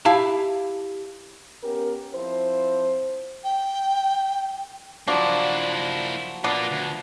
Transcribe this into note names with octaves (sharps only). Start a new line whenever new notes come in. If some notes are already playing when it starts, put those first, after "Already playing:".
E4 G4 F5 A5
B3 C#4 G4 A#4
F3 C4 E4 C5
G5
F3 F#3 A#3 D4 E4
A#3 B3 D4 F4
D2